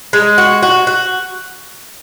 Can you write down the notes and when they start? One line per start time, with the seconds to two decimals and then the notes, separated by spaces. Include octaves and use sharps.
0.13 G#3
0.38 F#4
0.63 F#4
0.87 F#4